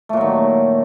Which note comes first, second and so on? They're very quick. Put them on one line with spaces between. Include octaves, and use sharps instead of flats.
A3 A#2 F#3 D#3